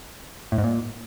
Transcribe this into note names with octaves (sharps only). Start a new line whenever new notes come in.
A2
G#2
A#2